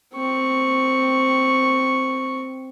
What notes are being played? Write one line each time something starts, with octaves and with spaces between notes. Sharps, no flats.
C4 C#6